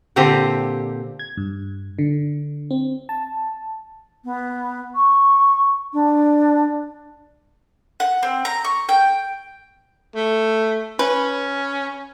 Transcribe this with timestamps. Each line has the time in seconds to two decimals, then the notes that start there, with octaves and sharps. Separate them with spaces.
0.16 A#2 D3 C4 G4 A#5
1.19 G#6
1.37 G2
1.99 D3
2.71 C4
3.09 A5
4.24 B3
4.95 C#6
5.93 D4
8.00 F#5
8.23 C4
8.45 A#5
8.65 C#6
8.89 G5
10.15 A3
10.99 C#4 B4